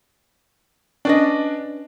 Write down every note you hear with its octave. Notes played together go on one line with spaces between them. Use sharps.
C#4 D4 B4 D5 D#5